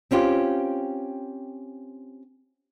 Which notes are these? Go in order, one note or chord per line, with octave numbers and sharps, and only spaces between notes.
C4 C#4 F4 G4